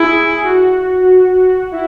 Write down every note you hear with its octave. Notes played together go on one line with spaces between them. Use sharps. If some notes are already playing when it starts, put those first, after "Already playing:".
Already playing: E4 G#4
F#4
E4